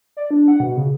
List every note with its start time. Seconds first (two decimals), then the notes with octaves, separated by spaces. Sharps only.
0.17 D5
0.31 D4
0.48 F#5
0.60 B2
0.77 C#3